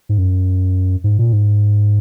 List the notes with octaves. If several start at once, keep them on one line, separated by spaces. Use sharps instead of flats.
G#2
F#2
G#2
A#2
G#2